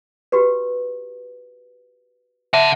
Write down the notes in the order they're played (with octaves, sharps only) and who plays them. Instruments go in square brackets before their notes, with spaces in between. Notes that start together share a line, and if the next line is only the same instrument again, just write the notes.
[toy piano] F#4 G4 B4
[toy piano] E5 [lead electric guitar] F#5 A5